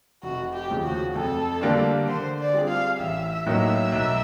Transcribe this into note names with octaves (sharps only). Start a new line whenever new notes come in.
F1 F#4
G4
D#2 C#3 F3
F#4
F2 A4
D3 G3 A#3 D4
D3 C5
D5
G3 C4 F4 G#4
F5
A1 E5
A2 F#3 A#3 D#4
B1